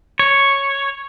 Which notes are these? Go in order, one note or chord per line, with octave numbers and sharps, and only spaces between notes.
C#5